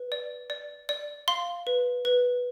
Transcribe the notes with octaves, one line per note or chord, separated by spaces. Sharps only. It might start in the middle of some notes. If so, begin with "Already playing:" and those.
Already playing: B4
D5
D5
D5
F5 C6
B4
B4